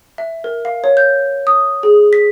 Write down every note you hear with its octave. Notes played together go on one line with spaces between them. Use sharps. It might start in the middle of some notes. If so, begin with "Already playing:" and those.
E5
A#4
F5
C#5
G6
D#6
G#4
B6